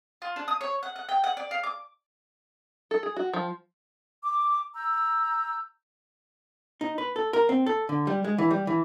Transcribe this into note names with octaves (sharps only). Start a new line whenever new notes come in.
F4
D4
D#6
C#5
F#5
F#5
G5
F#5
D5
F5
D6
A4
G#4
F#4
F3
D6
A#5 E6 G6
D#4
B4
A4
A#4
C4
A4
D3
G3
G#3
E3
G3
E3